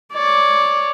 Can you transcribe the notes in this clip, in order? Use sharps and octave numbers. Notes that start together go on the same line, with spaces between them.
C#5 D5